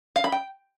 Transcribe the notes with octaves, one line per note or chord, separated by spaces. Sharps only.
F5
B5
G5